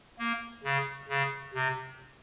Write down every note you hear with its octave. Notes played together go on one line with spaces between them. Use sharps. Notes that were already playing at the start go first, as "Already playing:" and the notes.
A#3
C#3
C#3
C3